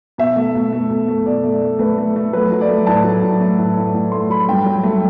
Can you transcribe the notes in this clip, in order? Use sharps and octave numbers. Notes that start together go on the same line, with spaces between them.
B2 E5
A3
B2
A3
B2
A3
B2 D5
A3
A3
A3 B4
A3
A3
F#3 B4
F#3
D5
A3
A2 A5
F#3
A2
A3
A2
A2
A2
A3 C6
F#3 B5
G2 G5
F#3
A3